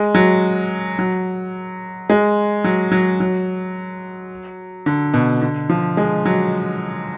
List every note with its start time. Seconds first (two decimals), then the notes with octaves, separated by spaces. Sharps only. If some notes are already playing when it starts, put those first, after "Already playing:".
Already playing: G#3
0.15 F#3
0.99 F#3
2.10 G#3
2.64 F#3
2.92 F#3
3.20 F#3
4.86 D3
5.14 B2
5.41 D3
5.69 F3
5.97 G#3
6.25 F#3